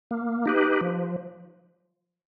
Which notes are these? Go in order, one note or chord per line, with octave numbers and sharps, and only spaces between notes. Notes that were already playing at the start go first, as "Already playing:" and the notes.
A#3
D#4 G4 B4
F3